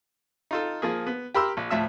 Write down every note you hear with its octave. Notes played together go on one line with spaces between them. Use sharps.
D#4 F4 A4
F3 A#3 G#4
B3
G4 A#4 B5 C6 E6
A#1
D2 A2 F3 E5 E6